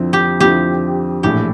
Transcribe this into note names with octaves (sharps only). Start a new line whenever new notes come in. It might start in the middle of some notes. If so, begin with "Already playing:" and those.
Already playing: F2 D3 F3 C4 E4
G4
F2 D3 F3 C4 E4 G4
A#1 A2 E3 A3 G4